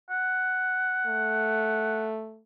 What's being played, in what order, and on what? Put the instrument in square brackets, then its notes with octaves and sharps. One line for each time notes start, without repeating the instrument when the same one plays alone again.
[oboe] F#5
[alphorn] A3